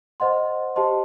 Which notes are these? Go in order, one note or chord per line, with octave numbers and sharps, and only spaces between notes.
C5 D#5 F#5 C6
G4 C5 D#5 A5 C6